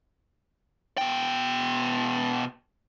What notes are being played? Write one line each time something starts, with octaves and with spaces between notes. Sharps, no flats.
B2 G5